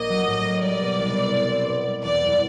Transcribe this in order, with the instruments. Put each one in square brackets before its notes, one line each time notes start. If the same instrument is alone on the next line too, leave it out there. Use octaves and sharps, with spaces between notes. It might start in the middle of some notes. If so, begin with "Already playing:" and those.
Already playing: [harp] A#1 A#3 [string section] D#5
[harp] F#3
A2
A#3
[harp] G3 [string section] D5
[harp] B2
C2
C4
B2
C4
B2
G3
[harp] E2 [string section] D5
[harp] F#1